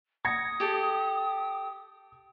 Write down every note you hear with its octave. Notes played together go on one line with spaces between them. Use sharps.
D#6 G#6 A#6 C#7
G4 A4